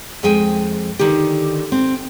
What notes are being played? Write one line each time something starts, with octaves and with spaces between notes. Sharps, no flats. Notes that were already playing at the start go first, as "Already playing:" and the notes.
F2 G#3 G#4 G5 G#5
D3 D#3 G4
C4